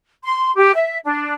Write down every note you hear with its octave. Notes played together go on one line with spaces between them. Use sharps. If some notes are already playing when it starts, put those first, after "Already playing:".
C6
G4
E5
D4